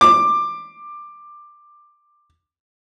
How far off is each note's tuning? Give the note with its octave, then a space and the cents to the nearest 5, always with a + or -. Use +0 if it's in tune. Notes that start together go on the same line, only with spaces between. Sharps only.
D6 +15